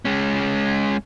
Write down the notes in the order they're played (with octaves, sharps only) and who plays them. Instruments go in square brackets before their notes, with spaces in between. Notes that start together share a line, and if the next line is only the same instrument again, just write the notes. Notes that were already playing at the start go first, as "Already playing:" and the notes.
[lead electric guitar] G#3 C#4